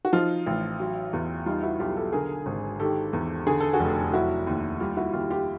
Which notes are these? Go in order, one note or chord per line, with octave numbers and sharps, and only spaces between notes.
F#4
F3 D#4 F4
A1
F#3
E2
G3 D#4 F4
E4 F#4
B1 F4 G4
G4 A4
D3 G#4 A#4
G#1
D#3 G4 A4
E2
D3 G#4
A4
F#4 G#4
F1
F#3 E4 F#4
D#2
G3 F4 G4
E4 F#4
D#2 F4 G4
F4 G4